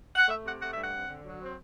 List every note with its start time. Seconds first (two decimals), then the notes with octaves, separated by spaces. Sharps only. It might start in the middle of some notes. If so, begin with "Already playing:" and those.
0.15 F#5
0.28 A3 E5
0.43 C3 F#5
0.60 A3 F#5
0.70 E5
0.76 G2
0.81 F#5
0.92 C4
1.08 D3
1.24 F#3
1.41 C4